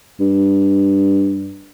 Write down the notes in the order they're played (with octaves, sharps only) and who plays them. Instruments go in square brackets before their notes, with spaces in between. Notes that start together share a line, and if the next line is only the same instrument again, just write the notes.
[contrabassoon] G2